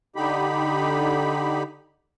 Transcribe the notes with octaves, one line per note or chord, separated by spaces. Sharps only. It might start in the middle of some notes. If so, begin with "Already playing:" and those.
D3 D#4 G4 B5